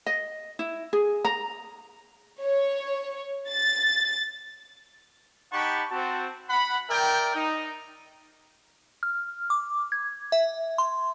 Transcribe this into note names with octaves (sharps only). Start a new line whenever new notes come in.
D#5
E4
G#4
A#5
C#5
A6
D#4 G4 F#5 A5 B5 C#6
C4 F#4 A5
F#5 B5
A#4 D5 E5 G5
D#4
F6
D6
G#6
E5
C6